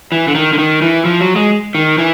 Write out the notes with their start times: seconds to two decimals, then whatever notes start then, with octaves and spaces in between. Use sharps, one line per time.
0.12 E3
0.28 D3
0.35 D#3
0.53 D3
0.58 D#3
0.82 E3
1.05 F3
1.21 F#3
1.36 G#3
1.75 D#3
1.98 E3